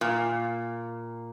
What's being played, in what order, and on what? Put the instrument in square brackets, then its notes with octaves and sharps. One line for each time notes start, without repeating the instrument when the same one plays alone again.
[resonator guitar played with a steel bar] A#2